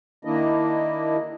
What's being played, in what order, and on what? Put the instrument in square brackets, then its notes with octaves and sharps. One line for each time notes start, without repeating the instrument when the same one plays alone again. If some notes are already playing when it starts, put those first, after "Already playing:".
[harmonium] D#3 A#3 D4 E4 D#5